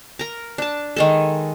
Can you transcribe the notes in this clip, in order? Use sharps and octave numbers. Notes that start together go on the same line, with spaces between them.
A#4 A#5
D4 A5
D#3 G#3 A4